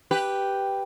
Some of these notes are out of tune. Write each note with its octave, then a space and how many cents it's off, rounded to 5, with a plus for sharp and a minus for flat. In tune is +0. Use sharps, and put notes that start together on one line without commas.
G4 +0 B4 +0